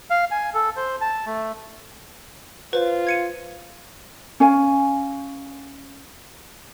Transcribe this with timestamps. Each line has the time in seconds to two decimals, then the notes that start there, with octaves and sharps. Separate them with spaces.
0.10 F5
0.31 G#5
0.54 A4
0.77 C5
1.01 A5
1.26 A3
2.73 F4 B4 C5
3.07 G#6 C#7 D#7
4.40 C#4 F5 G#5